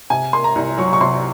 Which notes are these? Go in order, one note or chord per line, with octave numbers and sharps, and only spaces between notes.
C3 G#5
A#3 C6
A#5
C2
F#3 C#6
C#6
C3 C6